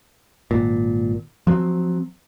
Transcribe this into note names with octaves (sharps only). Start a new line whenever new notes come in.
G#1 A#2
F3 F#3 A#3 C4